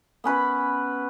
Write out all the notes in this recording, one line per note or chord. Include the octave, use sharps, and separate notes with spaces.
B3 C#4 B4 B5